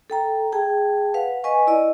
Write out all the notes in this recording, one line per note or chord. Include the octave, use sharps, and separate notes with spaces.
A4 G5 A#5
G#4 G5 A5
B4 F5 F#5
B4 D#5 G#5 C#6
E4 D5 D#5